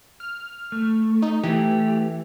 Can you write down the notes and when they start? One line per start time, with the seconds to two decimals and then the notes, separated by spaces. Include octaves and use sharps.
0.20 F6
0.72 A3
1.22 D#4
1.44 E3 A3 G4